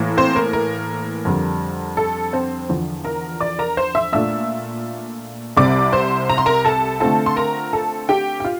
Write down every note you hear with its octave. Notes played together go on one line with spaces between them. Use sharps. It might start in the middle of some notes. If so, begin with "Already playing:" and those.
Already playing: A2 E3 A#3
C4 C5
A#4
A#4
F2 D3 G3
A4
C4 C5
E2 D3 F3
A#4 A#5
D5 D6
A#4 A#5
C5 C6
E5 E6
A#2 A3 D4 F4 E5 E6
C2 C3 G3 C4 D5 D6
C5 C6
A#5
C6
A#4 A#5
A4 A5
D3 A3 C4 F4 A4 A5
C6
A#4 A#5
A4 A5
G4 G5
G5
F4